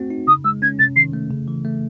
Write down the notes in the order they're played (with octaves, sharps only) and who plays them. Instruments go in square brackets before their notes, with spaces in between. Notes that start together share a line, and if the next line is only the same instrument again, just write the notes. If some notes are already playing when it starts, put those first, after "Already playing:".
Already playing: [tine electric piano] A3 C4 F#4
D#4
[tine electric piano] C#3 [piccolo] D#6
[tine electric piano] G#3 [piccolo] E6
[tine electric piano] C#4 [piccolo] G#6
[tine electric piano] C3 [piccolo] A6
[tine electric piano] D#3 [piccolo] C7
[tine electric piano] A3
C#3
E3
A3